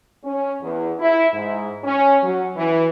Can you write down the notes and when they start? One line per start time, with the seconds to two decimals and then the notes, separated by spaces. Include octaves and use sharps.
0.24 C#4
0.62 E2
0.99 E4
1.34 G#2
1.84 C#4
2.23 F#3
2.56 E3